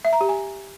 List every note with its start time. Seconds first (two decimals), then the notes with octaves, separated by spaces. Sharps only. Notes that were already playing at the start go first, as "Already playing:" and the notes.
0.05 E5
0.13 A#5
0.21 G4
0.29 G#5